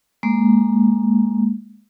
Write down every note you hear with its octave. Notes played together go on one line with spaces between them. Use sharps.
G#3 A#3